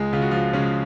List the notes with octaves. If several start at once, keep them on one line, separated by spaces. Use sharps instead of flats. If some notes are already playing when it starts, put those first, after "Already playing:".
Already playing: C#2 G#3 G#4
C#3 F4
F#4
F3 F4
C#3 G#3 C#4